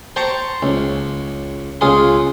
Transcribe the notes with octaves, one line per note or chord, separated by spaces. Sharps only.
C5 G5 A5 A#5 C6 C#6
C#2
C#2 F4 G#4 C6